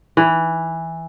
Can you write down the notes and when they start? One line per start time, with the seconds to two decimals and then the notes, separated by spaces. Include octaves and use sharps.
0.17 E3